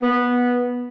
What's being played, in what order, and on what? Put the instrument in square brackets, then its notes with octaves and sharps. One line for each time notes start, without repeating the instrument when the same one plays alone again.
[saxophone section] B3